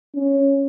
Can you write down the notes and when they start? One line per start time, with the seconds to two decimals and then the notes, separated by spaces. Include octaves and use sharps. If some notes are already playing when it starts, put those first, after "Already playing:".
0.15 C#4